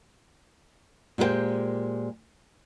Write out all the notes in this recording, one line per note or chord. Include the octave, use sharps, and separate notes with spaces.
A#2 G#3 G4 A#4 C5 G5